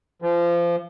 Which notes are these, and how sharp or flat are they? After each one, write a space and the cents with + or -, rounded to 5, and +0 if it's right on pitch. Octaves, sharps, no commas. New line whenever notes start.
F3 -25